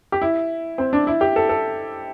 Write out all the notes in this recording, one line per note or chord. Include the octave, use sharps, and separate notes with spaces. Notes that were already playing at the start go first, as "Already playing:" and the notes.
G4
E4
C4
D4
E4
G4
A4
A4